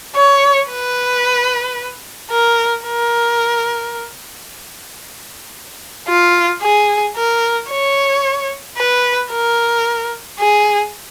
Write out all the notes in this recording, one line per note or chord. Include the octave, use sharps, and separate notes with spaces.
C#5
B4
A#4
A#4
F4
G#4
A#4
C#5
B4
A#4
G#4